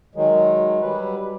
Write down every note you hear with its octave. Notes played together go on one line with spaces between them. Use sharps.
D#3 F#3 G#3
F#3 G3 B4